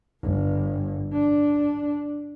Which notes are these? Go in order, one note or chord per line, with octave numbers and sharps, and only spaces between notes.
G1
D4